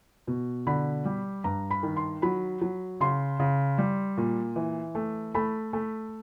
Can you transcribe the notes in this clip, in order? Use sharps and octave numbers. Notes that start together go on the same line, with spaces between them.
B2
D3 B5
G3
G2 A#5
B5
D#3
C6
F#3 B5
F#3
C#3 C6
C#3
G3
A#2
E3
A3
A3 B5
A3